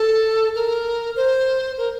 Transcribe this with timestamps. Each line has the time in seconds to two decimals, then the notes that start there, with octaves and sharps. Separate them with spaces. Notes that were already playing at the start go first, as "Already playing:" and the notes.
Already playing: A4
0.55 A#4
1.16 C5
1.78 A#4